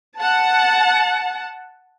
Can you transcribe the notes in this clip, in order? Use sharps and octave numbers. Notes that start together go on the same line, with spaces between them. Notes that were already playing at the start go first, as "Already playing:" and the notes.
F#5 A5